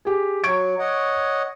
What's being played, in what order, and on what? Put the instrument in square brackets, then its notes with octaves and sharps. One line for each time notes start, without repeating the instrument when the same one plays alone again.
[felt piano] G4 G#4
[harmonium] F#3 [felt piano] C#6 G#6 D7
[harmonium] C#5 D#5 F#5